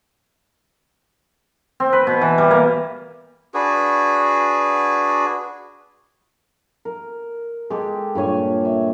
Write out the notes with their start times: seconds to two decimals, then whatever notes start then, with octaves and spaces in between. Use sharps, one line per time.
1.80 C4
1.93 B4
2.07 B2
2.21 E3
2.38 G3
2.51 A#3
3.54 D4 F#4 G#4 B4
6.85 A#4
7.70 G#3 G4 A4
8.15 G2 A#2 C#5 G#5
8.65 E5